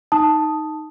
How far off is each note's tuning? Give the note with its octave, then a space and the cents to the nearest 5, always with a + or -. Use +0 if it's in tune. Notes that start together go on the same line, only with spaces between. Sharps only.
D#4 +0 A5 +0 D#6 +0